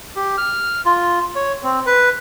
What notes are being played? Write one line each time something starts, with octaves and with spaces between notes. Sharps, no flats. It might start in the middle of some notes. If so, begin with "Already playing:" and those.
G4
F6
F4
C#5
C4
B4